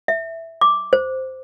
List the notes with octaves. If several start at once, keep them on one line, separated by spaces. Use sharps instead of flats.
E5
D6
C5